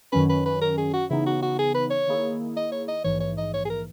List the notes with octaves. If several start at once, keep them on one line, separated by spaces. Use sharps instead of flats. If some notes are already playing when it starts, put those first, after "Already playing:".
F#2 D#3 F#3 C#4 B4
B4
B4
A#4
G#4
F#4
C#3 E3 B3 D#4 E4
F#4
F#4
G#4
B4
C#5
D#3 A#3 E4 G#4
D#5
C#5
D#5
A#1 G#2 E3 C#5
C#5
D#5
C#5
G#4
A#4